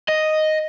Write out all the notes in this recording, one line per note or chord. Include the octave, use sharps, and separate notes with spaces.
D#5